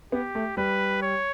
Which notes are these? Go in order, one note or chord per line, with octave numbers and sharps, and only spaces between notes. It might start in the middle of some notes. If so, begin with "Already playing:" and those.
B3 G4
A3
G3 B4
C#5